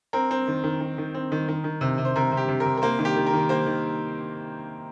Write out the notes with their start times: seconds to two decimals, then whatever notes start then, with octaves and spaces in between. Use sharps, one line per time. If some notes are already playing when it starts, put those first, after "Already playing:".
0.13 C4 A#4
0.31 C4
0.48 D#3
0.64 D#3
0.81 D#3
0.98 D#3
1.15 C4
1.32 D#3
1.49 D#3
1.64 D#3
1.81 C3
1.98 C3
2.05 C5
2.16 C3 A#4
2.32 C3
2.37 G4
2.48 C3
2.60 A#4
2.66 C3
2.77 A#4
2.82 A#3 C5
2.99 D#3
3.05 G4
3.17 D#3
3.27 A#4
3.33 D#3
3.49 A#3 C5
3.66 D#3